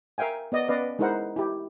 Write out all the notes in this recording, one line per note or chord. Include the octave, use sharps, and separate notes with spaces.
A#4 E5 F5 G5 G#5
B3 D5 D#5
B3 C#4 B4 D5 D#5 F5
G#3 D#4 E4 A#4 C5 F#5
E4 G4